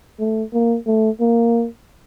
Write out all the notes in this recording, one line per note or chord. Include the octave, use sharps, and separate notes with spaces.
A3
A#3
A3
A#3